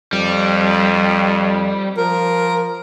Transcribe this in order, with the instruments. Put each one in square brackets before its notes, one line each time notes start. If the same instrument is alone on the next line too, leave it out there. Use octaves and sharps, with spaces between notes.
[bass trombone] F2 [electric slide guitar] G3
[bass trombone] F3 [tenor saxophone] A#4